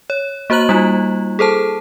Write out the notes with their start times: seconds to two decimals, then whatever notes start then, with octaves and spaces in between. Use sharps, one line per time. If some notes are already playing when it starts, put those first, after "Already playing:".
0.10 C#5
0.50 A#3 F#4 C5 A#5 F#6 F#7
0.69 G3 A#3 D#4 F4
1.39 G#4 A4 C5 A5